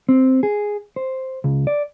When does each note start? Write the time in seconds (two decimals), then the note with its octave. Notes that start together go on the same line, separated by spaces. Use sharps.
0.09 C4
0.43 G#4
0.96 C5
1.44 C#2
1.67 D5